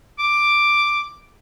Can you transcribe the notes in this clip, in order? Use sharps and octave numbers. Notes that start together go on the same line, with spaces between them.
D6